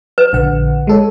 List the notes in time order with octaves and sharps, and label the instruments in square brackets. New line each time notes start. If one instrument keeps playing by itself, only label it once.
[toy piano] B4
[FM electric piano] A#1 D3 F#5
G#3 A4 C#5